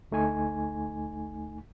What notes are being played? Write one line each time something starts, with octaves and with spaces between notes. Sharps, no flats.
D2 A3 D#4 G#5